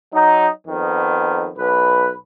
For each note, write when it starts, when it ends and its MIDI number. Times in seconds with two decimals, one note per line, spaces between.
0.13 0.48 54
0.13 0.48 63
0.68 1.50 41
0.68 1.50 51
0.68 1.50 59
1.58 2.14 35
1.58 2.14 71